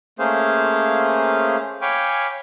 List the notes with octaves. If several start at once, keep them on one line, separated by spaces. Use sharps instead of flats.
A3 A#3 C#4 G#4 C5 F5
C#5 F5 G5 G#5 B5 D6